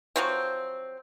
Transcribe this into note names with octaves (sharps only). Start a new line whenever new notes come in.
F3 F#3 C4